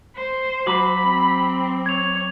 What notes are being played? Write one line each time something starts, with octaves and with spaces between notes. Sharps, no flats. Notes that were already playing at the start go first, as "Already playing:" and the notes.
C5
F#3 B5 D6 F#7
C4
C#5 G#6 F7